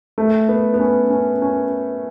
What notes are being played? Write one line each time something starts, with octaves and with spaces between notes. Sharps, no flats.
A3
B3
B3
C#4
C#4
C#4